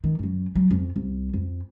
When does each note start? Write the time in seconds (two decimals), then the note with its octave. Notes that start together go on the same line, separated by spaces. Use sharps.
0.04 D#3
0.19 F#2 F#3
0.55 F#3
0.70 F2
0.96 C2
1.33 F2